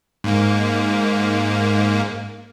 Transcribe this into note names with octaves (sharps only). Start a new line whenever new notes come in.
G#2 A#3